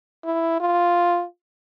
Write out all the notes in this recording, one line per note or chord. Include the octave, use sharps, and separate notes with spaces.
E4
F4